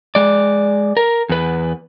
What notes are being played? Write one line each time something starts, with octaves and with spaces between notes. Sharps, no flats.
G#3 D5
A#4
E2 B4